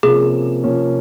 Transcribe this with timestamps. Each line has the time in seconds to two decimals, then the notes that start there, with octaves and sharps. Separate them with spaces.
0.03 C3 F3 A#3 C#4 G#4
0.64 C3 F3 A#3 C#4